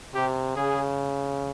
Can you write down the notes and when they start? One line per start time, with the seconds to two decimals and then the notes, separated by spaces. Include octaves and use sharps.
0.15 C3 G4
0.56 C#3 G#4